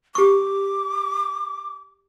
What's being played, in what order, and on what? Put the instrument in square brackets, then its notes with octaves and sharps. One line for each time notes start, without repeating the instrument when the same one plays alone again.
[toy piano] G4 C#6 [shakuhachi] D6